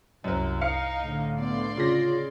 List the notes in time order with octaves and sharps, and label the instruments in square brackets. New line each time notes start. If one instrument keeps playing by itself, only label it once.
[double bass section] C2 [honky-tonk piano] F#2 F#3
[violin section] D#4 [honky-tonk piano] F5 F6 C#7
[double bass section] A2 D3
[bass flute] B3 [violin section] D5 C6
[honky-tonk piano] C#3 A#6 [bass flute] F4